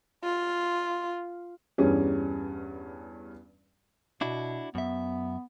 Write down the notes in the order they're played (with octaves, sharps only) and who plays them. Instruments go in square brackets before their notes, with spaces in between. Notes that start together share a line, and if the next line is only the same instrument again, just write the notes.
[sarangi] F4
[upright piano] E2 G2 G3 C#4 G#4
[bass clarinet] B2 [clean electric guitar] D4 E4 F#4
[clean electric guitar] F#2 E5 [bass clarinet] B3